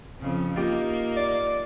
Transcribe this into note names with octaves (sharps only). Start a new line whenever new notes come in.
F2 C#3
A#3 D#4 F4 G4
D5